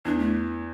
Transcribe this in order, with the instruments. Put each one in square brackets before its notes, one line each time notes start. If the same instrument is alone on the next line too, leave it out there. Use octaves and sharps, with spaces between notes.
[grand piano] E2 [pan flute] D4
[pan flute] A3